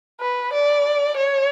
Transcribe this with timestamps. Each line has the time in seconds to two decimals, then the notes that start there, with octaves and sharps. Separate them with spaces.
0.20 B4
0.53 D5
1.17 C#5